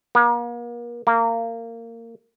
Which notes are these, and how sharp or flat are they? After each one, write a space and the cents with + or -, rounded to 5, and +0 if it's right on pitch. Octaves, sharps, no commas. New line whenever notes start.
A#3 +40
A#3 -20